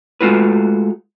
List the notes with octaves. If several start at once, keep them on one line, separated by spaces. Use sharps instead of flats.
G#3 A3 F4 F#4 B4